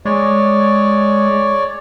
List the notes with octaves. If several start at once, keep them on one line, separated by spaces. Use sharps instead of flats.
G#3 C#5 D5